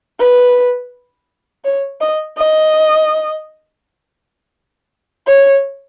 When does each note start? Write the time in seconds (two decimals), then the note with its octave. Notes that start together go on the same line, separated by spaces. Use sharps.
0.20 B4
1.65 C#5
2.01 D#5
2.38 D#5
5.27 C#5